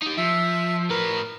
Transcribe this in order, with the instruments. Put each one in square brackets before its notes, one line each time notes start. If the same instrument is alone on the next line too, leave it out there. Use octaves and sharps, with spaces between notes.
[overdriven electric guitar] D#4 G4
[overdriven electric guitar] F3 [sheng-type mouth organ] E5
[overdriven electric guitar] A2 B4 [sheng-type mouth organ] A#4